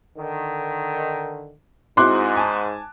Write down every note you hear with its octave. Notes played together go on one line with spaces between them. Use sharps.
D3 D#3
G#2 C4 E4 F#4 C6 D6 F#6
G#5 A5